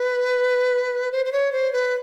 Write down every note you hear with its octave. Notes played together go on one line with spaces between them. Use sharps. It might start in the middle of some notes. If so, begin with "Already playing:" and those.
Already playing: B4
C5
C5
C#5
C5
B4